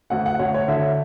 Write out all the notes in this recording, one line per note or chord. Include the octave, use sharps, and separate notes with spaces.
D2 F#5
F#5
D2 C#5
C#5
D3 E5